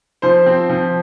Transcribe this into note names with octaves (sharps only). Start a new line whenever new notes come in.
F3 C5
C4
F3